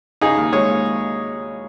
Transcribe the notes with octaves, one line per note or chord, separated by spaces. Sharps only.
C#3 D#4 G#4
D#2
G#3 G#4 C#5
D#2